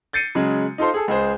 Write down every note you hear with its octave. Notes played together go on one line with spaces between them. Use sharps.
G6 A6 C7 C#7 D#7
C#3 F#3 G#3
D#4 F4 A4 C5 C6
G#4 A4
C#2 G#3 G#4 C5